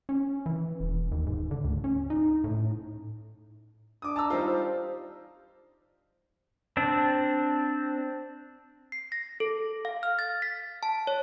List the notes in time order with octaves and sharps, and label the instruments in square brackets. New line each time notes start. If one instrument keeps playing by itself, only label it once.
[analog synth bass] C#4
E3
E1
D#2
G#2
D3
D2
C#4
D#4
A2
[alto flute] D4 [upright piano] D6 D#6
[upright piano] A5 A#5 E6
[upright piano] G3 D#4 F4 [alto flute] C5
[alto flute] C5
[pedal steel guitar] C4 D4
[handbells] C7
A#6
A4
F5
F6
A6
B6
A5
C#5